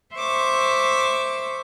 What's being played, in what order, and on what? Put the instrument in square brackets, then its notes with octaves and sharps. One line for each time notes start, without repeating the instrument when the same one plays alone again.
[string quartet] C5 E5 C#6 D6